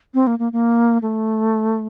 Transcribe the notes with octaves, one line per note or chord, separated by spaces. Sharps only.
C4
A#3
A#3
A#3
A3